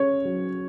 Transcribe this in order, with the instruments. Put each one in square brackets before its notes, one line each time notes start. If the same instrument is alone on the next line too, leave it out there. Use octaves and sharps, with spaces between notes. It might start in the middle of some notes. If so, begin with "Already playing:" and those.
Already playing: [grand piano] C#4 G#4 [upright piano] C#5
[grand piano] F#3